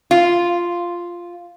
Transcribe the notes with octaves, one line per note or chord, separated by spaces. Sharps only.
F4